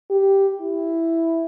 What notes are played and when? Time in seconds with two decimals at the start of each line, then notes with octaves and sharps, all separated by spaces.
0.10 G4
0.61 E4